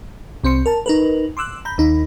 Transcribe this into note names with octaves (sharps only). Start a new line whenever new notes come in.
C2 C4 C6 C#7
A#4 A5
D#4 A#4 B4
C6 D6 E6 F#6
A#5 B5 G6
D#2 D#4 B5